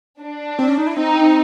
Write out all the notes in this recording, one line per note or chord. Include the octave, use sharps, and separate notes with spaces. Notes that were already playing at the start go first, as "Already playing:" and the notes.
D4
C4
C#4
D#4
E4
C4 D#4